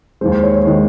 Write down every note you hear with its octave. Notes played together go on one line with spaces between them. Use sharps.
D#2 D#3 G#3 C5
C5
C#5
C#5
D#3 G#3 C5